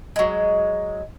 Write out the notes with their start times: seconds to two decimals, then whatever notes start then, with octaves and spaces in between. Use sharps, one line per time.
0.16 F#3 G#3